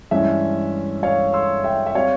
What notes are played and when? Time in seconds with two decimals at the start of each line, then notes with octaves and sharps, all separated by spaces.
0.11 G2 E3 G#3 C#4 E5
1.03 C#5 F5
1.33 C6 E6
1.64 E5 G5
1.87 E5
1.95 G3 C4 C#5 F5